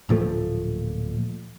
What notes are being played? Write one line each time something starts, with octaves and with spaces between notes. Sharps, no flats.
D1 A#2 F3 A3